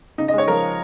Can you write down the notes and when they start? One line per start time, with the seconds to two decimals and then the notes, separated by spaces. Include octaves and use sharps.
0.18 C#3 D#4
0.28 D#5
0.33 G#3 C#5
0.48 F3 A#4